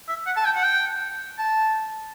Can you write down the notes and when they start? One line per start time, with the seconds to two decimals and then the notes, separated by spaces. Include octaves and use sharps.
0.09 E5
0.26 F#5
0.37 A5
0.45 G5
0.55 F#5
0.63 G5
1.39 A5